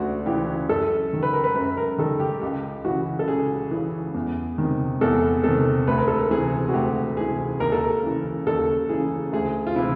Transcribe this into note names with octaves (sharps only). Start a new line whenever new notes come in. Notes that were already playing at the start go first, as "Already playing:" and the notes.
Already playing: D2 C#3 D4 F#4
C#3 E3 G4
F#2 A4
D#3
B4
A#4
B4
F#2 B4
A#4
D#3 A4
G4
C#2 G4
C#3 E3 F#4
A4
C#2 G#4
C#3 E3
E2
C3 D#3
E2 A4
C3 D#3 A4
D2 B4
A#4
A4
A#4
C3 E3 G#4
F#4
D2 G4
C3 E3 G#4
D#2 A#4
A4
A#4
C#3 E3
D#2 A4
C#3 E3 G#4
D2 G#4
F4
C3 E3 E4